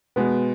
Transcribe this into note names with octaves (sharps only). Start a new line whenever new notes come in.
B2 G#3 B3